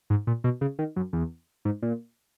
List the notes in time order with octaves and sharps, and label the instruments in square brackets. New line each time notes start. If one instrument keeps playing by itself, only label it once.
[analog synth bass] G#2
A#2
B2
C#3
D#3
F#2
E2
G#2
A#2